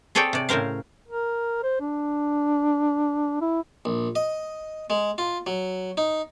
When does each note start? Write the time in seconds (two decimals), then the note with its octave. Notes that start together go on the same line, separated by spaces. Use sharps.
0.15 C4 G#4 A4 C#5 D5 G5
0.33 C3 D5
0.49 A2 C#3 A#4 C5 F5
1.08 A#4
1.63 C5
1.80 D4
3.41 E4
3.85 A#1
4.15 D#5
4.90 G#3
5.18 F4
5.47 F#3
5.97 D#4